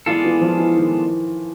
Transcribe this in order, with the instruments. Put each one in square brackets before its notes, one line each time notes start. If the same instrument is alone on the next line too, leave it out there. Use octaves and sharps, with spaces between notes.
[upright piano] E3 [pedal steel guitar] G#3 B3 D4 F4 A4
[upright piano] E3
F3
E3
D#3